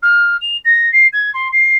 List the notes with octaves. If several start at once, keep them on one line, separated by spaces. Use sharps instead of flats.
F6
F7
A#6
C7
G#6
C6
C7